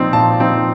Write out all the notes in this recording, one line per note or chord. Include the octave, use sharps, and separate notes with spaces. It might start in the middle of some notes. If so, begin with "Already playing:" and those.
Already playing: A#2 F3 C4 D#4
A#2 A5
F3 C4 D#4